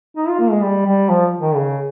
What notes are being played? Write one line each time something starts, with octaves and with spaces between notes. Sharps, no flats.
D#4
F4
A#3
G#3
G3
G3
F3
D#3
C#3